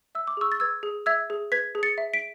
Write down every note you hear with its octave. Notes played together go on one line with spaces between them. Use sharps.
E5 E6
D6
G#4 C#6 E6
A6
B4 E6 G#6
G#4
E5 E6 G#6
G#4
B4 G#6 B6
G#4
A6 C#7
E5
B6 D7